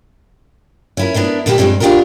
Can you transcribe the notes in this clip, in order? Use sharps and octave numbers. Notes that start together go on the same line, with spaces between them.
C#4 E4 A#4
B3 D4 E4 A#4
A#2 G3 A#3 E4 G4 A5
G2 F3 G3 G#3 C4
E2 D4 F4 G4 G#4 A#4